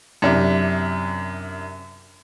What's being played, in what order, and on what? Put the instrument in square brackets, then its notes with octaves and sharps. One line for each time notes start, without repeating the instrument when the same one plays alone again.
[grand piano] F#2 C3 D4 E4